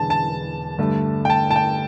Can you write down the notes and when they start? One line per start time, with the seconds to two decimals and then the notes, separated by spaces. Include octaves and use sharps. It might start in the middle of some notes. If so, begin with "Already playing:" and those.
Already playing: E1 E2 D3 B3 A5
0.10 A5
0.78 G2 D3 A3
1.25 G5
1.30 A5
1.51 A5
1.56 G5